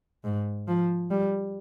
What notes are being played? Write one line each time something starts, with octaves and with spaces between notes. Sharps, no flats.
G#2
F3
G3